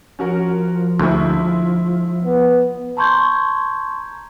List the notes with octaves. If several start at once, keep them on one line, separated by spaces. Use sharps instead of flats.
F3 C#4 F#4 A#4
D2 G#3 E4
B3
A5 A#5 C6 C#6 G6 G#6